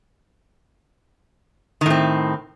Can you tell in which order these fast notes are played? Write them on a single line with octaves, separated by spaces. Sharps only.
D#3 A2 C4